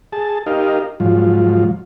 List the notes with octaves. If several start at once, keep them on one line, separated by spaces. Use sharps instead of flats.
G#4 A5
D#4 G4 A#4 D#5 F5
G#2 F3 F#3 F4